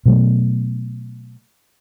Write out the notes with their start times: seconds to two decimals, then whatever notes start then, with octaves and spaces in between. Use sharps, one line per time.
0.06 B2 F#3 A3